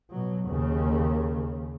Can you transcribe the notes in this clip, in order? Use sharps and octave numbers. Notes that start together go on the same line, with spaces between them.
B2 F#3
D#2 C#3